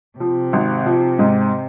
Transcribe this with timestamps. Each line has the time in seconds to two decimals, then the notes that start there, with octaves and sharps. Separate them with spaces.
0.20 C3 F3
0.53 G#1
0.86 F3
1.19 G#2